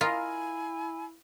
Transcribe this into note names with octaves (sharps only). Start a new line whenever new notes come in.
E4 F4 A#4 D#5 F5 G#5